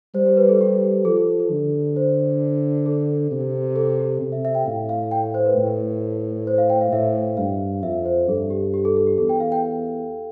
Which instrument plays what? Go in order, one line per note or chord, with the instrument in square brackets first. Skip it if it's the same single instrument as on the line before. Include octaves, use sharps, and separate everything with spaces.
[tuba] G3 [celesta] C5
[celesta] C5
B4
A4
G4
[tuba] F3 [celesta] A4
[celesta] A4
A4
[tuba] D3
[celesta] C5
A4
[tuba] C3
[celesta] A4
G4
[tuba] C3
[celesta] E5
E5
G5
[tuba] A2 [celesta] F5
[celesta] F5
G5
C5
B4
[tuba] A2
[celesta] C5
F5
G5
F5
[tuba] A2 [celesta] E5
[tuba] G2 [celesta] F5
[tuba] F2 [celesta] E5
[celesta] C5
[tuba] G2 [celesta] A4
[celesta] G4
G4
A4
A4
G4
[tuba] E2 [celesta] A4
[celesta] G5
F5
G5